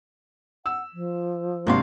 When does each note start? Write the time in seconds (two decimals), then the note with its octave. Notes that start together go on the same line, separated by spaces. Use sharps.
0.66 F#5 E6
0.93 F3
1.67 G#1 C3 A#3 D4 F5 C6